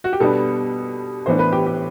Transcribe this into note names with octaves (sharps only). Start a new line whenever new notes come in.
F#4
G4
B2 G3 B3 D4 A4
A2 E3 B3 D4 C5
B4
G4
G4